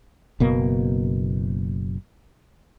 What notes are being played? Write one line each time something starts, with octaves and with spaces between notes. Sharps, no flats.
F#1 B2 A#3